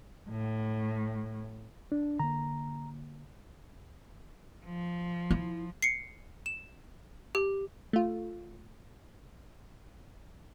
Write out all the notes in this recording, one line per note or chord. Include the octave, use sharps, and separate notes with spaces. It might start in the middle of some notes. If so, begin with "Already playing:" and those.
A2
D4
D3 A#3 A#5
F3
E4
C7 C#7
E7
G4
A3 F4